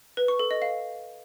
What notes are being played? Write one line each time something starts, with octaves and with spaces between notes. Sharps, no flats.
B4
C#6
A4
D#5
F5